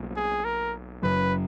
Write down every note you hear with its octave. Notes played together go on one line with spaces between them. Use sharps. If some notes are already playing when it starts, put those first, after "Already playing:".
Already playing: B1 B2 A#3
G#4
A#4
F#1 F#2 C#3 F#3 B4